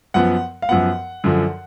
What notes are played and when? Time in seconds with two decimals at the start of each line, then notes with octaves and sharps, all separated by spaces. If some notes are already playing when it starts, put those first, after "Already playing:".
0.14 F#2 F3 B3 F#5
0.62 F5
0.69 F#2 F3 B3 F#5
1.24 F#2 D3 F3